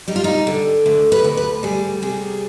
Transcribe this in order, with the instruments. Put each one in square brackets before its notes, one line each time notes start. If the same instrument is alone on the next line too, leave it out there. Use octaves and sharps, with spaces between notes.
[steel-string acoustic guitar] G3 D#4
F4
D#4
D3
D2
B4
D2
B4
G3 G#4
C3 G#4